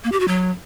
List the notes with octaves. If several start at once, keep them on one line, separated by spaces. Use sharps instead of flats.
A#3
G4
F#4
F#3